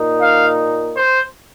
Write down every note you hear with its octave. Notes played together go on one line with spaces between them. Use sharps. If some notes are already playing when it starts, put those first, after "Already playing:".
Already playing: A#2 A#3 D#4
F5
C5